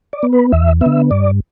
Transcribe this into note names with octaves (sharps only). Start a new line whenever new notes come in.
D5
B3
B4
E2 E5
D3 B3 E5
G2 D5